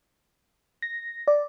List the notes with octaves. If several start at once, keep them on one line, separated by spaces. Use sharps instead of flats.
A#6
D5